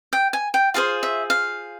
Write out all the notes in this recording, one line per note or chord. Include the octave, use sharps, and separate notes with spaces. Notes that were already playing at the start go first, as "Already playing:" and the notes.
G5
G#5
G5
F4 G#4 C5 F5
E5
F5